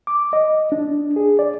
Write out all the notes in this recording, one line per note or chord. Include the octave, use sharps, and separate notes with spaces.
D6
D#5
D4
G#4
D5